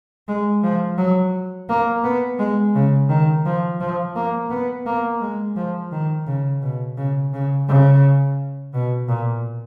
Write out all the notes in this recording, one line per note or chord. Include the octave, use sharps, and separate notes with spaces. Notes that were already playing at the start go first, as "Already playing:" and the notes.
G#3
F3
F#3
A#3
B3
G#3
C#3
D#3
F3
F3
A#3
B3
A#3
G#3
F3
D#3
C#3
B2
C#3
C#3
C#3
B2
A#2